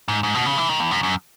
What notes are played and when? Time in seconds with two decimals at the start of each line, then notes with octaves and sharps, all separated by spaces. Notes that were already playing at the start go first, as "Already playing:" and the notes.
0.08 G#2
0.23 G#2
0.35 B2
0.46 C#3
0.58 E3
0.69 D#3
0.80 E2
0.91 F#2
1.03 F#2